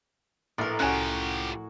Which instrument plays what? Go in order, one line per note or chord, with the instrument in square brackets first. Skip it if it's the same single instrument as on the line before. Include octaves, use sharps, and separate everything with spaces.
[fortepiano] A#1 [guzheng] A2 A#4
[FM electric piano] C2 C#4 [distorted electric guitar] F3 G4 [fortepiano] F#4 G#5 F#6